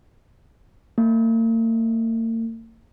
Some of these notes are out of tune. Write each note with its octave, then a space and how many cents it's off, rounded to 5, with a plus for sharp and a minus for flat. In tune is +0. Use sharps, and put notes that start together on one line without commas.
A#3 -45